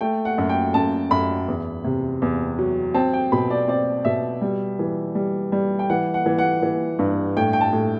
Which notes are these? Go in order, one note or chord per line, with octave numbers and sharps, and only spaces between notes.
A3 G5
F#5
F#2
G5
F#2 A5
F#2 B5
E2
C3
E2
F#3
C4 A5
G5
B2 B5
D5
C4 D5
B2 E5
G3
E3
G3
G3
G5
E3 F#5
F#5
E3
F#5
E3
G2
A2 G5
G5
A5
A2